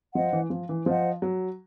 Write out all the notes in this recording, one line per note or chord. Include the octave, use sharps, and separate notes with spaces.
F3 C5 D#5 F#5
E3
F3
E3
F3 C5 D#5 F#5
F#3